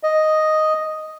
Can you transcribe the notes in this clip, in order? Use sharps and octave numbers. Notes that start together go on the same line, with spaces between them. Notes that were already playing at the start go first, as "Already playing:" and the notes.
D#5